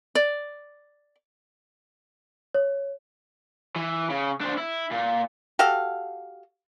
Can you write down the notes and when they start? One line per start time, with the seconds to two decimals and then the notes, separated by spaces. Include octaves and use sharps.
0.15 D5
2.54 C#5
3.76 E3
4.10 C#3
4.41 D4 C5
4.58 E4
4.92 A#2
5.59 F#4 G4 A4 F5